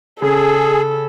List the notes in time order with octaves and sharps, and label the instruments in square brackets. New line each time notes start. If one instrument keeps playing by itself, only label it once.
[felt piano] C#3 [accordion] G#4 [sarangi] A4